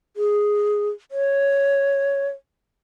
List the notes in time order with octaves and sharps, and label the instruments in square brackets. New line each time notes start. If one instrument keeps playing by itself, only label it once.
[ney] G#4
C#5